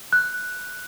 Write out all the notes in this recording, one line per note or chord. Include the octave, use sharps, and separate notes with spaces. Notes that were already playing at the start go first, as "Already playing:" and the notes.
F#6